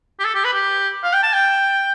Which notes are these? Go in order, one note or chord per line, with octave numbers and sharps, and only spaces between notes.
G4
A4
G4
B4
G4
F5
G5
A5
G5